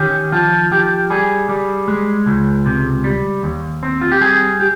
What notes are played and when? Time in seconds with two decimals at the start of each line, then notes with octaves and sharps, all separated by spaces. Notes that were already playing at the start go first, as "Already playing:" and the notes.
Already playing: D#3 C#4 G4
0.32 F3 F4
0.71 F3 G4
1.10 G3 G#4
1.49 G3
1.88 G#3
2.26 C#2
2.66 C3
3.04 G3
3.43 D#2
3.83 C4
4.01 F4
4.12 G4
4.21 G3 G#4
4.60 G4